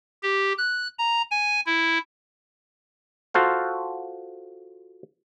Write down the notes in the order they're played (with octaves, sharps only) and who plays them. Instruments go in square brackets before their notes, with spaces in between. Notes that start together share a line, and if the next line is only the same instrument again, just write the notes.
[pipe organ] G4
F#6
A#5
G#5
E4
[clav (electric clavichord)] F4 F#4 A4 C5 F5